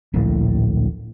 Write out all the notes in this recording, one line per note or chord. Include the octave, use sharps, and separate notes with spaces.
D1 A#1 A2